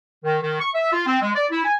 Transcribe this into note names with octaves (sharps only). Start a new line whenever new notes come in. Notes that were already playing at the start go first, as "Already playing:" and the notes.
D#3
D#3
C#6
E5
F4
C4
G#3
D5
E4
G#5